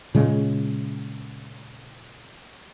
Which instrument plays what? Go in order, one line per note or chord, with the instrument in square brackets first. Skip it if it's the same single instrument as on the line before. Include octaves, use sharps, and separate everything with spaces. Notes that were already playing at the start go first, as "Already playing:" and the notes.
[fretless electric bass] A#2 C#3 G#3